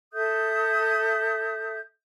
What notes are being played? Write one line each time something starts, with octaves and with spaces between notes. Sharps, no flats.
A4 E5 D#6 G6